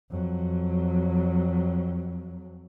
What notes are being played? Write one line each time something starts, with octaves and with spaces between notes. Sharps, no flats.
F2 F#3